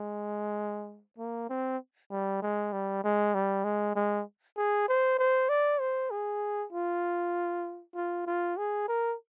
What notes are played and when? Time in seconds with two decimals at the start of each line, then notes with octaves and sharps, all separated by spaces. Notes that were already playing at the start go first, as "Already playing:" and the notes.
Already playing: G#3
1.18 A#3
1.50 C4
2.11 G3
2.42 G#3
2.72 G3
3.04 G#3
3.34 G3
3.64 G#3
3.96 G#3
4.57 G#4
4.88 C5
5.18 C5
5.49 D5
5.80 C5
6.11 G#4
6.72 F4
7.95 F4
8.27 F4
8.57 G#4
8.88 A#4